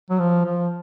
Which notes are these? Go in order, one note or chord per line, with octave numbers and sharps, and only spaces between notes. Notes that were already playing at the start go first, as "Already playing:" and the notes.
F#3
F3
F3